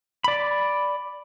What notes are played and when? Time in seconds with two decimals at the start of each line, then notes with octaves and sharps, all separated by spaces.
0.24 D5 B5